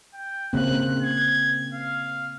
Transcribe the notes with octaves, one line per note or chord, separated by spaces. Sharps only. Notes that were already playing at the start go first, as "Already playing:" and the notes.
G5
C#3 A#3 C4 F#6
G#6
F5